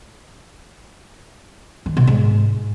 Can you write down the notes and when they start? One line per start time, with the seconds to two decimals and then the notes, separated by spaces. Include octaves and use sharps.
1.86 D#3
1.97 B2
2.07 G#2